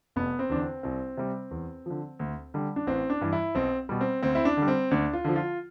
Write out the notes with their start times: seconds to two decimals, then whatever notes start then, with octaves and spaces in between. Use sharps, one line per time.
0.16 F1 B3
0.39 C4
0.50 E2 D3 D4
0.61 C4
0.83 C2 C4
1.17 C3 G3
1.51 E2
1.86 D3 F3
2.19 D2
2.54 D3 G3
2.76 D4
2.87 A1 C4
3.10 D4
3.21 G2 E3
3.33 E4
3.55 B1 C4
3.89 B2 G3
4.01 C4
4.23 D2 C4
4.35 E4
4.45 D4
4.57 D3 G3
4.68 C4
4.91 D2 D4
5.13 F4
5.24 D3 F3
5.36 F4